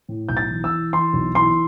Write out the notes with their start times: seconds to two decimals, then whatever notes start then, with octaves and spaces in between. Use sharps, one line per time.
0.09 A2
0.29 B1 G6
0.37 A6
0.50 E3
0.64 E6
0.71 E3
0.93 E3 C6
1.13 B1
1.35 E3 C6